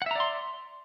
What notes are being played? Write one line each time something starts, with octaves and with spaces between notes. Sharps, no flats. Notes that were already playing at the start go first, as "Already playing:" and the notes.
D5 E5 F#5 A#5 C6